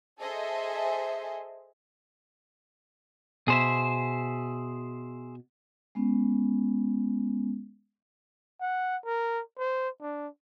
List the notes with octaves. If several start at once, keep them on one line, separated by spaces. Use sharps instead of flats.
G#4 A4 C5 D#5 E5 G#5
B2 G#4 C5 E5
G#3 B3 C#4
F#5
A#4
C5
D4